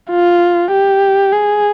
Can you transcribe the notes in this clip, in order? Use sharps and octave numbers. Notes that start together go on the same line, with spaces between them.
F4
G4
G#4